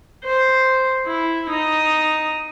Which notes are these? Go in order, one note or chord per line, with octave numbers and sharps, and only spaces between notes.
C5
E4
D#4 D#6